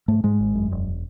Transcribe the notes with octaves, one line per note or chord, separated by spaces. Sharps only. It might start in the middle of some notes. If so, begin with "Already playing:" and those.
G#2 A3
G#2 G#3
G#1
F#2
E1